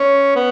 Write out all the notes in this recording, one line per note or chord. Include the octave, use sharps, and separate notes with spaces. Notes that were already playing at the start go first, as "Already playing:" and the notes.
Already playing: C#4
B3